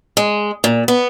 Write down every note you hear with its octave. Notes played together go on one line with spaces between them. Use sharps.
G#3
A#2
B3